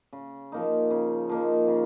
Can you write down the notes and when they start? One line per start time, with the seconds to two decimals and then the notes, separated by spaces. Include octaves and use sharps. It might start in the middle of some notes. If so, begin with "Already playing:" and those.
0.13 C#3
0.52 F3 A#3 D#4
0.91 C#3
1.29 F3 A#3 D#4
1.68 C#3